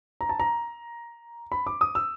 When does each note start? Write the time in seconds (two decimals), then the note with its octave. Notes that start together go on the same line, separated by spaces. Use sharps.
0.21 A#5
0.29 A5
0.40 A#5
1.52 B5
1.67 D6
1.81 D#6
1.95 E6